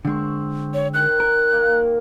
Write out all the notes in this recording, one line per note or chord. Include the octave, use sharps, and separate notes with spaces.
D3 G#3 C4 C#6
C#5
D#3 F#6
A#4
A#3